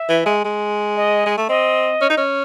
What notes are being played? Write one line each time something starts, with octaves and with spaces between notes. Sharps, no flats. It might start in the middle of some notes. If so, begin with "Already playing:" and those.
Already playing: E5
E3
G#3
G#3
D#5
G#3
A3
C4 D#5
C#4
D#4
C#4